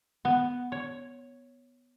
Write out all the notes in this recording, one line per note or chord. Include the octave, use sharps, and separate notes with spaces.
B3
C#5